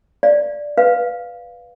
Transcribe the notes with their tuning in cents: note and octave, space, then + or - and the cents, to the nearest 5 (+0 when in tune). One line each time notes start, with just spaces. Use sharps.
D5 +0 F5 -10
B4 +0 F5 +0